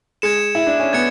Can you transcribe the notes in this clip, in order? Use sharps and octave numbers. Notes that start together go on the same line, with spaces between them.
G#3 G#6 C#7 E7
E4
D4
C#4
B3 G#6 C#7